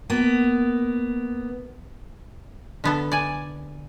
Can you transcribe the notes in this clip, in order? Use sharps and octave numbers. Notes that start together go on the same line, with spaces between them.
A#3 B3
D3 B3 A4
D5 G#5